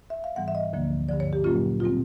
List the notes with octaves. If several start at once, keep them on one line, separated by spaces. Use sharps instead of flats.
E5
F5
G#2 E3 G3 B3 F#5
E5
D#5
D2 D3 F3 A#3
G2 D3 F3 D5
C#5
G4
A#2 F#3 A#3 C#4 F4
B2 G3 C4 F4